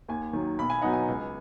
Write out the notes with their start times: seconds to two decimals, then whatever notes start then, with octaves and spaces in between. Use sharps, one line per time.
0.08 D#2 G#5
0.33 D#3 F#3
0.58 B1 B5
0.70 G#5
0.82 B2 F#3 B3 D#4 F#5
0.93 G#5
1.08 C#2